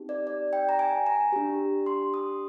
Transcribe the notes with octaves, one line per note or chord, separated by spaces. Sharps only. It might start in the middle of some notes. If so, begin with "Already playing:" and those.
Already playing: C4 D#4 G4
D5
D5
G5
A#5
G#5
A#5
D4 G4
C6
D#6